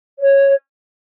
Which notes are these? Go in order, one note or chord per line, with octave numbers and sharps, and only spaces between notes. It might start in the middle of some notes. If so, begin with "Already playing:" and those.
C#5